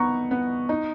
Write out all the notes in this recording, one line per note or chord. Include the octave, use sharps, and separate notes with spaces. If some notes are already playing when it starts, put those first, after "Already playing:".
Already playing: B3 D#4 A#5 C#6
B3
D#4